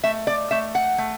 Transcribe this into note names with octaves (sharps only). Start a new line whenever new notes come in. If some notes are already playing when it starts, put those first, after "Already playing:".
A3 E5
D5
A3 E5
F#5
A3